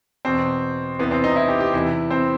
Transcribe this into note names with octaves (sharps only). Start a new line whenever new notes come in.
E2 B2 C4
E2 C3 E3 B3
C4
D#4
E4
G4
G4
E2 C3 E3 E4
C4